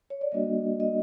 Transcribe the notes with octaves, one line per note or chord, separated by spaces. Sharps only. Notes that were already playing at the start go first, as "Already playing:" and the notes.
C#5
D5
G3 A#3 D4 F#4 D#5
D#5